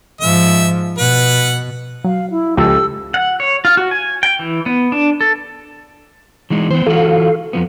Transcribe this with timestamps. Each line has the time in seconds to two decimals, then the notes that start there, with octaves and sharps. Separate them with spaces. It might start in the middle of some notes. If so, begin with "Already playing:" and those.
0.21 G#2 F3 E5
0.98 B2 B4 F#5
2.04 F#3 F5
2.30 E4
2.57 C#2 F3 G4 A4 E6
3.14 F#5
3.40 C#5
3.65 F4
3.77 F#4
3.91 G#5
4.23 G5
4.39 E3
4.66 B3
4.92 D4
5.21 A4
6.50 E3 G#3 D#4
6.71 E3 B3 C4 C5
6.86 E3 F4 F#4 A4 F5
7.53 F2 F3 B3